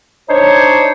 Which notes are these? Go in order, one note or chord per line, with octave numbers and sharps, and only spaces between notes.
D4 D#4 C5 C#5